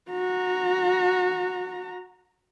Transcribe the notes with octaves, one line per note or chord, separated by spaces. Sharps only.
F#4 A#5